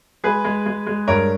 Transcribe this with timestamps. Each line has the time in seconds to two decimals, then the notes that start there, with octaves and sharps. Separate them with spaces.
0.24 G#3 G#4 B4
0.44 G#3
0.66 G#3
0.87 G#3
1.07 G2 A#4 C#5